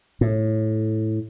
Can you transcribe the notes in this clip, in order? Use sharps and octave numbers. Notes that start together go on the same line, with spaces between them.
A2